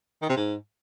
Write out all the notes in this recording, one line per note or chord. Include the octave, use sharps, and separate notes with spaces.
D#3
C3
G#2